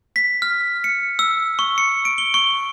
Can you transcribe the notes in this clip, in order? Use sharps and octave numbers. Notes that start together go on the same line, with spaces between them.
B6
F6
C#7
E6
C#6
C#7
D7
G7
C#6